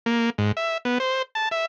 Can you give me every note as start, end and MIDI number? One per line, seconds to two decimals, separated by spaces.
0.06 0.30 58
0.38 0.52 44
0.57 0.78 76
0.85 0.98 59
1.00 1.22 72
1.35 1.49 81
1.51 1.66 76